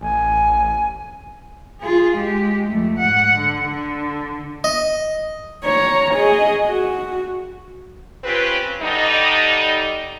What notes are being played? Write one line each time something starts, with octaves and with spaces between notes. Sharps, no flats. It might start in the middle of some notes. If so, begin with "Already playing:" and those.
A1 G#5
F4 G#4
G#3 G4
F2 A3
G#2 F#5
D3
D3
D#5
C#5 A#5
G#4 D#5
F#4
C4 C#4 F4 G4 B4
D3 G3 D#4